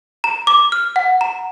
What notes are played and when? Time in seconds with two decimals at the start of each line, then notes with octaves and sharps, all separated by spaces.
0.24 A#5
0.47 D6
0.72 F6
0.96 F#5
1.21 A#5